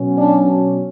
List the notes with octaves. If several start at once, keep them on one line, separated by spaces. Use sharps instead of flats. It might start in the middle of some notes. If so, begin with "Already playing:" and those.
Already playing: B2 F#3 C#4
D4